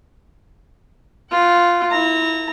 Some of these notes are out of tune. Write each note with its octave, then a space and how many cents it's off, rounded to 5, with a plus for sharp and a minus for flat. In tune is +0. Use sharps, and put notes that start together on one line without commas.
F4 +0 F#5 +30
E4 -25 A#5 -20